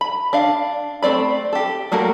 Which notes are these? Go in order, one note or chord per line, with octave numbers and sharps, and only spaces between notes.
B5
D4 F5
A3 C4 D5 B5
G4 A4
G3 A3 A#3 F#4 A#4